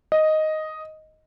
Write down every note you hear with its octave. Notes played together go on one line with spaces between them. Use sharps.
D#5